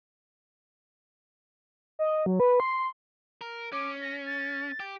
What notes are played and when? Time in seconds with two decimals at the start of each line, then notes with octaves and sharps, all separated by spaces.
1.99 D#5
2.26 F#3
2.40 B4
2.60 C6
3.41 A#4
3.73 C#4 D6
4.02 A#6
4.26 A6
4.80 G4